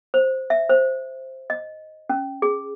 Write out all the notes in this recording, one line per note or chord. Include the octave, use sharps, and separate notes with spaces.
C5
E5
C5
D#5
C#4
G#4